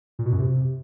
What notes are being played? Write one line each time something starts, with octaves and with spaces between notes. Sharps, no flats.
A#2
B2
F#2
C3